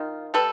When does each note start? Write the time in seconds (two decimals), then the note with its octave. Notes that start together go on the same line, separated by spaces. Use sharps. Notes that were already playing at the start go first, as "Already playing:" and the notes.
Already playing: D#3 F4
0.34 G3 A4 B4